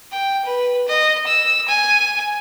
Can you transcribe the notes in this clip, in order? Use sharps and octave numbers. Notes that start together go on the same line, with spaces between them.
G5
B4
D#5
E6
G#5